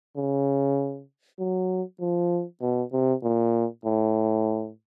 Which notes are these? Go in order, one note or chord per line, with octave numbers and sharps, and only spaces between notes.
C#3
F#3
F3
B2
C3
A#2
A2